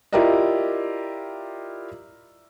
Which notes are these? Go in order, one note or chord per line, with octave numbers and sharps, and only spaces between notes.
E4 F4 G4 A#4 D5 D#5